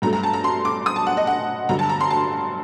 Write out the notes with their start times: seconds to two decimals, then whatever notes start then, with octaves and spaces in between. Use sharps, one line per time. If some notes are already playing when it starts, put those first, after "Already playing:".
0.02 G2 F#3 A3 A#5
0.13 A#5
0.23 A5
0.34 A#5
0.44 C6
0.65 D6
0.86 D#6
0.96 A5
1.07 F#5
1.17 D#5
1.27 F#5
1.69 G2 D3 F#3 A#5
1.79 A5
1.89 A#5
2.01 C6
2.11 A5